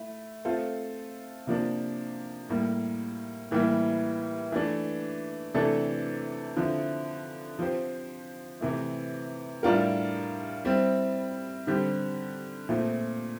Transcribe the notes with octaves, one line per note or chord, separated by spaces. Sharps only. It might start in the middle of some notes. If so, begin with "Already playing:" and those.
Already playing: A3 E4
A3 C4 F4 A4 C5
C3 F3 A#3 D4
A2 G3 A#3
A2 E3 G3 A#3 E4
E3 A3 D4
C3 E3 A3 D4 A4
D3 F3 C4 E4
F3 C4 G4 C5
C3 E3 A3
A2 G3 D4 F4 A#4
G3 C4 E4
D3 G3 C4 G4
A#2 F3 A3 C4